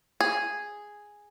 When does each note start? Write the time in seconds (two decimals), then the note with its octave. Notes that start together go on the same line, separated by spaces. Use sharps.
0.20 G#4